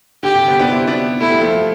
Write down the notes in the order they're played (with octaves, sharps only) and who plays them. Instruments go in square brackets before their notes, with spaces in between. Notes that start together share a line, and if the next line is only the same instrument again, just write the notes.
[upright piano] D3 [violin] G4
[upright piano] C3
G3 B3
B3 D4
C4 E4
B3 D4
[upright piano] A3 [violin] E4
[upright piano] G3
F3 A3